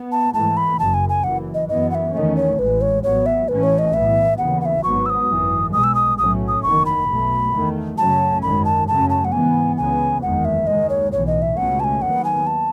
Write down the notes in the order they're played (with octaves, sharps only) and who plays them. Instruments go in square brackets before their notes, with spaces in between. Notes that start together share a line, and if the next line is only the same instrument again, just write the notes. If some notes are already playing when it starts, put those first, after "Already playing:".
Already playing: [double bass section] B3
[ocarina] A5
[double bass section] G#2 E3 A3 [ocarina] A5
[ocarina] B5
[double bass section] F#1 F#2 C#3 [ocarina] A5
[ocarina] G#5
G#5
[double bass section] F#1 F#2 E3 [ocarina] F#5
[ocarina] D#5
[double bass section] F#2 E3 B3 [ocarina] D#5
[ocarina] F#5
E5
[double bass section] E2 D#3 A3 C#4 [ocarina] D#5 E5
[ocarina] C#5
[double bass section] A1 A2 E3 G#3 [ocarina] B4
[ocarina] C#5
[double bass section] A1 A2 F#3 B3 [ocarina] C#5
[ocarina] E5
[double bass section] A1 A2 E3 A3 C#4 [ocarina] B4
[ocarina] C#5
D#5
[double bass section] B1 A2 E3 B3 [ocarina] E5
[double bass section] D#2 C#3 E3 B3 [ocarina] F#5
[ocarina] F#5
E5
[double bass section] G#1 G#2 F#3 B3 [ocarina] C#6
[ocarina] E6
D#6
[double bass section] G#1 F#2 E3
[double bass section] B1 B2 G#3 [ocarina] D#6
[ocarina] E6
D#6
[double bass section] B1 A2 F#3 A3 C#4 [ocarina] D#6
[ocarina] D#6
[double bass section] F#1 E2 D#3 [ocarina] C#6
[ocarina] B5
[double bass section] B1 B2 A3
E2 D#3 A3
[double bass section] F#2 C#3 F#3 A3 C#4 [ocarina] A5
[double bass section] G#1 F#2 D#3 G#3 [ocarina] B5
[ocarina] A5
[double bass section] F#2 C#3 F#3 A3 C#4 [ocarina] A5
[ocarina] A5
F#5
[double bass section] G#2 E3 B3 [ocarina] G#5
[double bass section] C#2 C#3 E3 B3 [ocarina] G#5
[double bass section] F#1 E2 D#3 G#3 [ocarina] F#5
[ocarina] E5
[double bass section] D#2 D#3 G#3 [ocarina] D#5
[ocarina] C#5
[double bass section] B1 A2 E3 [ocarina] C#5
[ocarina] D#5
E5
[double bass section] C#2 B2 A3 C#4 [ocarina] F#5
[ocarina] A5
G#5
[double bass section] D#2 D#3 F#3 B3 [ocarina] F#5
[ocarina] G#5
A5